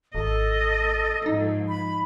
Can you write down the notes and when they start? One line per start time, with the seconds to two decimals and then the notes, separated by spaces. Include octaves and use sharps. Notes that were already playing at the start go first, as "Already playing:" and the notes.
0.15 G#1 A4 D#5
1.26 G#2 F3 D#4
1.68 B5